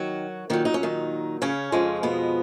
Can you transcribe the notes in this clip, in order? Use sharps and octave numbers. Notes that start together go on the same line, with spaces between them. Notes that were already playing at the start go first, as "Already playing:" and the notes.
Already playing: D#3 F#3 F#4
A#2 D#3 F#3 D#4
D#4
C#4
D#3 D#4
C#3 C#4
F2 C#3 F3 G#3
B2 B3